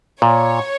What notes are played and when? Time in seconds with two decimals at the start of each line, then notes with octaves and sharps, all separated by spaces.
0.22 A#2 C#5